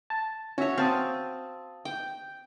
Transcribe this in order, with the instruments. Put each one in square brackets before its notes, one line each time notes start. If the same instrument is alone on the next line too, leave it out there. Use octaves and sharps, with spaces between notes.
[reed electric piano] A5
[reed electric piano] C#4 E5 [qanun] F#4 C#5
[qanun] C4 [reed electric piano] F5 A5 D#6
[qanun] G5